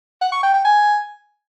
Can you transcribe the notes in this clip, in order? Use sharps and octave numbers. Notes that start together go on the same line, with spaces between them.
F#5
C#6
G5
G5
G#5